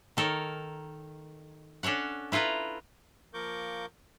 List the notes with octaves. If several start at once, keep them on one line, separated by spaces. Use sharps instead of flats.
D#3 A4 A#4 C#5
C#4 D4 A4 C#5 F#5
E4 F4 A4 B4 A#5
F3 A#3 A#4 C#6 D6 G6